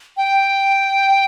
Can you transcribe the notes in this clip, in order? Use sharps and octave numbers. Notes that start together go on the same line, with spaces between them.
G5